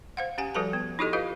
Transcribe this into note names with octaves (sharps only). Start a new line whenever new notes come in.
C5 F5 F#5
C#4 G4 F#5 G#5
F3 G3 F#4 A4 B4 A5
B3
D#4 E4 F#4 G4 A4 D#5
F4 G4 B4 D#5 F5